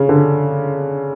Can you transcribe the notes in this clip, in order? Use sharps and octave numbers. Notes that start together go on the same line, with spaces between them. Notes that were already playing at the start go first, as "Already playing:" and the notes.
Already playing: C#3
D3